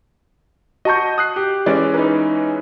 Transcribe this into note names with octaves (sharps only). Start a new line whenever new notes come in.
F#4 D#5 A5 C#6 G6
D#6 F#6 C7
G4
E3 G#3 C#4 D5
D#4 B4